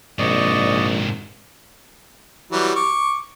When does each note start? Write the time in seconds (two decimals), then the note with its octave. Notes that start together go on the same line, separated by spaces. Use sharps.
0.19 A#1 G#2 C3 D5 D#5 C#6
2.51 E3 F#3 G3
2.76 C#6 D6